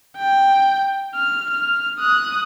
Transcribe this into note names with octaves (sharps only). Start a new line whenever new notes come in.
G5
F6
F6
D#6 F#6